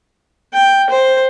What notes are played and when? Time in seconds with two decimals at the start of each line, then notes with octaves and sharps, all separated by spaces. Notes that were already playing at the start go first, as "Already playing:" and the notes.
0.54 G5
0.90 C5